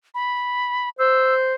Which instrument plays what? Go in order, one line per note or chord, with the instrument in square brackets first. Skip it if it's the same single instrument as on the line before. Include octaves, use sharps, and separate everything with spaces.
[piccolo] B5
[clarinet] C5 [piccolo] E6